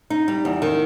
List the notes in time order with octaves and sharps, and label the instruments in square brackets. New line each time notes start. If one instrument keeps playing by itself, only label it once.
[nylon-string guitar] D#4
G3
E2
D#3